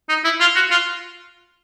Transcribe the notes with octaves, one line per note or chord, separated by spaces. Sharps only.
D#4
E4
F4
F#4
F4